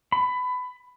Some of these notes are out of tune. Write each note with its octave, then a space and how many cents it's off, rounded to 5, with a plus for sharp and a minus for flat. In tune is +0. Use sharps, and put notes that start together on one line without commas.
B5 +20